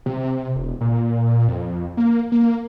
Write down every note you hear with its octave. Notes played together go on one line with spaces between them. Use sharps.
C3
E1
A#2
F2
A#3
A#3